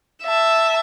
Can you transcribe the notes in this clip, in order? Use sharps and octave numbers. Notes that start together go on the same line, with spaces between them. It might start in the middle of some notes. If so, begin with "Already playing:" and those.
E5 A5